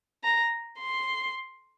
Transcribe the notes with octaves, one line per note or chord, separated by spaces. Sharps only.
A#5
C6